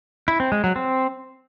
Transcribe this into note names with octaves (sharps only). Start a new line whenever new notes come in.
E4
C4
G#3
F#3
C4